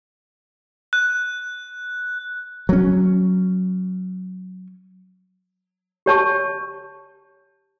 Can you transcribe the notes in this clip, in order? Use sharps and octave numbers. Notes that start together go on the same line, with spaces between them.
F#6
F#3 C#4
G4 C#5 A5 C#6